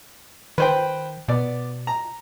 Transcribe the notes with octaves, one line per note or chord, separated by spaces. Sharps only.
D#3 B4 C5 G5
B2 B3 D5
A#5